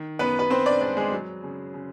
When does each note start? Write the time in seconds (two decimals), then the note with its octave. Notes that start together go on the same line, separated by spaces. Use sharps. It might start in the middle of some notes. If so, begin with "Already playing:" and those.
Already playing: D#3
0.19 F#2 B3 B4
0.39 B4
0.50 F#2 C4 C5
0.66 D4 D5
0.81 G#3 D4 D5
0.97 G#3 G#4
1.12 F#3
1.43 C#3
1.74 C#3